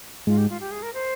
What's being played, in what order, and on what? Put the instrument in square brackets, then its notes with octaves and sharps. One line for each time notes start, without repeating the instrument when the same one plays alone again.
[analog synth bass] G#2 [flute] F4
[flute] G4
F4
G4
G#4
A#4
C5